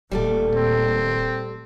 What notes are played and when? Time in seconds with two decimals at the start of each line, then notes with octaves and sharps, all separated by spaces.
0.11 D#1 A#2 G3 A3 A4
0.55 C4